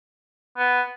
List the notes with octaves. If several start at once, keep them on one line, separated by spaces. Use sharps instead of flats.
B3